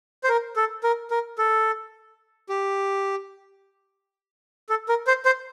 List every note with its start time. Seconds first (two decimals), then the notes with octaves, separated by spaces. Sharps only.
0.24 C5
0.29 A#4
0.56 A4
0.84 A#4
1.11 A#4
1.38 A4
2.49 G4
4.69 A4
4.89 A#4
5.07 C5
5.25 C5